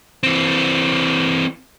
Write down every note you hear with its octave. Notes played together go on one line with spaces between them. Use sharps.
E3 C4